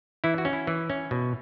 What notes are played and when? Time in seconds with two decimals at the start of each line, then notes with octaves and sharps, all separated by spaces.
0.24 E3 E4
0.38 F#4
0.45 C#4
0.53 E4
0.67 E3
0.90 C#4
1.11 B2